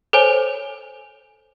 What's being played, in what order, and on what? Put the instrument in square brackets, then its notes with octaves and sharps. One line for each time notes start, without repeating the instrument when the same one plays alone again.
[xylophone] A4 C5 C#5 G#5